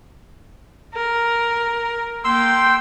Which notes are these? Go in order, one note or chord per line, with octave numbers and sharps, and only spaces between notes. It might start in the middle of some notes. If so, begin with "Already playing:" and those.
A#4
A#3 G5 C6 E6